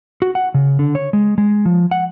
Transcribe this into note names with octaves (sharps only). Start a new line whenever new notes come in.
F#4
F#5
C#3
D3
C#5
G#3
G#3
F3
F#5